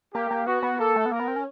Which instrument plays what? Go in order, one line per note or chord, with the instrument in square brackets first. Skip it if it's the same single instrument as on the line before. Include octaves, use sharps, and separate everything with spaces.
[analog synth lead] A#3 [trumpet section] G4
[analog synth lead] A#3
[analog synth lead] B3 [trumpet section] F#4
[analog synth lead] B3
[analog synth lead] A#3 [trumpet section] A4
[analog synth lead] A3
B3
[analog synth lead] A#3 [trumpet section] A#4
[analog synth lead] B3
C4
C#4